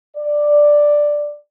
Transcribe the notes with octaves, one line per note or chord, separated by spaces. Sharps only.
D5